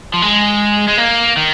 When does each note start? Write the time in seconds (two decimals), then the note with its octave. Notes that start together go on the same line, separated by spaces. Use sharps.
0.14 F3
0.22 G#3
0.89 G#3
0.98 A#3
1.37 D#3